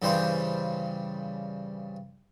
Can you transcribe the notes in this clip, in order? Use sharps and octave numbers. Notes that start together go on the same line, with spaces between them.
G2 C#3 E3 G3 C5